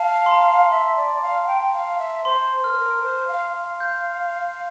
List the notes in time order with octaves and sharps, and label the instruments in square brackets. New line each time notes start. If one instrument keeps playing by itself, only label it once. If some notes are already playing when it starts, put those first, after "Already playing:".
Already playing: [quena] F5 [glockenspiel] A5
[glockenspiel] C6
A#5
[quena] E5 [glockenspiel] C6
[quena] D5
F5
G5
F5
E5
[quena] C5 [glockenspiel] C6
[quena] A#4 [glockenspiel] F6
[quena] C5
A#4
C5
F5
F5
[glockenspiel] G6